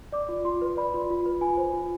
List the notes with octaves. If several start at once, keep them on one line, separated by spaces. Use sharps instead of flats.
D5 D6
F4
F4 C6
B4
D5 B5
F4
F4
B4
F4 G#5
C5
F4